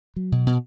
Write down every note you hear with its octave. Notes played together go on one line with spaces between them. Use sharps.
F#3
B2
B2